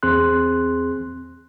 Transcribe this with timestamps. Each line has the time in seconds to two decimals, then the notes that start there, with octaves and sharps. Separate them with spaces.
0.03 E2 C4 G#4 C6 F#6